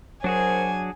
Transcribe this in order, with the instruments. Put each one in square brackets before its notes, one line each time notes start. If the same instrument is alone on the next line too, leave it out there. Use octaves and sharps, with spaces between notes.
[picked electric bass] F#3 [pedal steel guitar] D4 F#4 G#4 [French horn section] A#4 C5 [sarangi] G#5